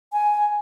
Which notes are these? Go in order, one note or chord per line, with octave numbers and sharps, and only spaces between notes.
G#5